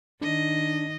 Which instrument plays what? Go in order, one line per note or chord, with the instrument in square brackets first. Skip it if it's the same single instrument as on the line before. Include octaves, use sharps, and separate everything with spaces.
[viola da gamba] D#3 D#5 [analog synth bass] D4